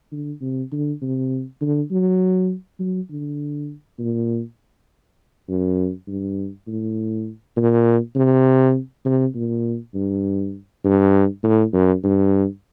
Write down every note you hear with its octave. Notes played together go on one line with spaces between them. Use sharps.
D3
C3
D3
C3
D3
F#3
F#3
D3
A#2
F#2
G2
A2
A#2
C3
C3
A#2
G2
G2
A2
F#2
G2